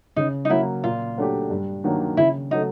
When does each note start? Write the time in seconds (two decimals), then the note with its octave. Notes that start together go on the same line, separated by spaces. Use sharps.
0.16 C#3 D#4
0.45 D#4
0.50 F#3 A#3 E4
0.84 A#2 F4
1.18 F#3 A3 D4 G4
1.50 G2
1.84 D#3 F#3 A#3 D4
2.17 C#3 E4
2.51 F#3 A3 D#4